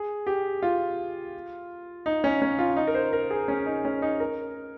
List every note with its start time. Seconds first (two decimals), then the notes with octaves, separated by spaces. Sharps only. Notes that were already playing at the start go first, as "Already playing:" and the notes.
Already playing: G#4
0.27 G4
0.62 F4
2.06 D#4
2.24 C#4
2.42 C#4
2.59 F4
2.76 D#4
2.87 A#4
2.95 C5
3.13 A#4
3.31 G#4
3.48 C#4
3.66 D#4
3.85 C#4
4.02 D#4
4.20 A#4